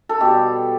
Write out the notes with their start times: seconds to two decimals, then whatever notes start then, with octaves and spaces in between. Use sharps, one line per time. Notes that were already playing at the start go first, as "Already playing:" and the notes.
0.09 A4
0.20 B2 G3 G4